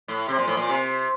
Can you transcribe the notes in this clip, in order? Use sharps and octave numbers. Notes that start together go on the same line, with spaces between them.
A2
C3
A#2
A2
A#2
C3